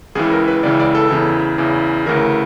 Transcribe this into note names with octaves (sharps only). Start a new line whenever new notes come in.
C#2 C#3 E3 G#4
A#4
B4
C#2 C#3 E3 D5
D5
A4
E2 C#3 E3
E2 C#3 E3
D2 C#3 E3 A#4